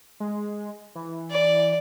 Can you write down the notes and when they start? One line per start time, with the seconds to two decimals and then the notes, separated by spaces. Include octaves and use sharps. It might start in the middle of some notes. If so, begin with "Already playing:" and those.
0.20 G#3
0.95 E3
1.31 D5